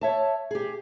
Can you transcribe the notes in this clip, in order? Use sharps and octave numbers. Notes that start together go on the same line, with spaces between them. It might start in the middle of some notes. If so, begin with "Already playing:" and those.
C#5 E5 A5
G4 G#4